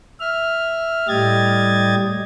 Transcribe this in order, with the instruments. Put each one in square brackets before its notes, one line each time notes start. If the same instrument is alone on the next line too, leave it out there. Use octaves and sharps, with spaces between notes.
[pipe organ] E5 F6
A2 G3 G4 D#5 G#6 A6